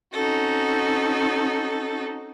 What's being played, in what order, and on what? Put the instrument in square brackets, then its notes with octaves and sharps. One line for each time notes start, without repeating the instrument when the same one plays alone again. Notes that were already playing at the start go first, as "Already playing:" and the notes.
[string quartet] C4 C#4 D#4 F#4 A4